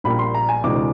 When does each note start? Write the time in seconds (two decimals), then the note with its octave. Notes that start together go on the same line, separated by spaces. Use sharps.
0.04 A#1 A#2 G3 A#3 B5
0.19 C6
0.34 A#5
0.49 G#5
0.64 D2 C3 E3 G#3 D6